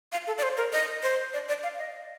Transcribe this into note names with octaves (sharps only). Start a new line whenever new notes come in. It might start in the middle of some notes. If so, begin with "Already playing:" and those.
F5
A4
D5
C5
A#4
D#5
C5
D5
D5
F5
D#5